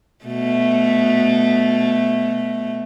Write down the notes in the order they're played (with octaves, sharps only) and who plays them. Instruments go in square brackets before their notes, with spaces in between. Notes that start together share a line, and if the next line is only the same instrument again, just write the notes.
[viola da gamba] B2 A3